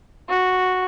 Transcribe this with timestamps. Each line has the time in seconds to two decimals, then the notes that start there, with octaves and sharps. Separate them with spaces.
0.29 F#4